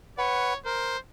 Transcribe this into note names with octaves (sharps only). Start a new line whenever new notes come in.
B4 C#5 F#5
A#4 C5